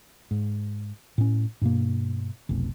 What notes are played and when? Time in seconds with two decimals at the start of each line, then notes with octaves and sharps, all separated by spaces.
0.31 G#2
1.18 A2 C#4
1.62 G2 B2 A#3
2.49 F1 B1